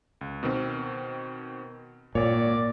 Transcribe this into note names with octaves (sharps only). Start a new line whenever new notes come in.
C#2
B2 D#3 C4
G#1 A#2 C#5 D5